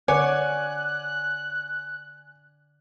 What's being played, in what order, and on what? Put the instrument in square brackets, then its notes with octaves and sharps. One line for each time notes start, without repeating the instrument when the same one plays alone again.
[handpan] D3 D5 F#5 [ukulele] C#5 [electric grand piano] G#5 D6 [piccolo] F#6